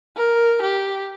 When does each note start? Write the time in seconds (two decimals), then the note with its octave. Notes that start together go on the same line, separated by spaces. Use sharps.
0.17 A#4
0.62 G4